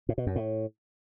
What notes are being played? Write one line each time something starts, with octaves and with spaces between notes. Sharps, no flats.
A2
B2
F#2
A2